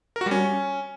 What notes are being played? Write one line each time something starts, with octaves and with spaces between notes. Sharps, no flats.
A#4
F#4
G3
C#4